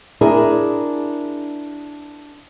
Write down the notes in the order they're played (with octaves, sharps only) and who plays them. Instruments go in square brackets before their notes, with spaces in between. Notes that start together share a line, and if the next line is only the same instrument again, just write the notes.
[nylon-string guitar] D4 E4 G#4 A#4